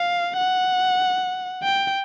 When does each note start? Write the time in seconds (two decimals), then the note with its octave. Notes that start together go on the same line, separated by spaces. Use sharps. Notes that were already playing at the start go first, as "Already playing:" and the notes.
Already playing: F5
0.38 F#5
1.63 G5